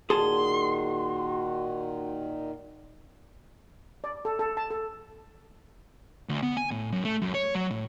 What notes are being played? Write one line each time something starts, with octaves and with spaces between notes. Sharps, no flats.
A#2 D#3 F#4 G#4 A5 C6
D5
A4
A4
A5
A4
D2
B3
G#5
A2
F#2
A3
F#2
C#5
F#3
A2